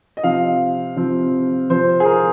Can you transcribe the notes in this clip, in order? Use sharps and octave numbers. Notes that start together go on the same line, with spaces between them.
D#5
C3 F3 C4 F5
C3 F3 C4
C3 F3 C4 C5
G#4
A#4